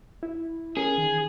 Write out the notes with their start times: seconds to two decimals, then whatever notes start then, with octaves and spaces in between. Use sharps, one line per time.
0.23 E4
0.77 C#4 G#4 A#4
0.98 D#3